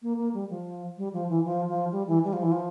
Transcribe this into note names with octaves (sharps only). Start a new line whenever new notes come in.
A#3
A#3
G3
F3
G3
F3
E3
F3
F3
G3
E3
G3
F3
E3
F3